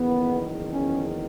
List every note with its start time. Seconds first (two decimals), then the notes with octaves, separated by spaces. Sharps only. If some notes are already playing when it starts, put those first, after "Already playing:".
Already playing: F#1 E2 D#3 B3
0.73 C#4